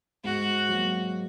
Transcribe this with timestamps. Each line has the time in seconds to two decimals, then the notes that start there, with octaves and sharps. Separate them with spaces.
0.24 G#2 F#4
0.69 F#3 A#3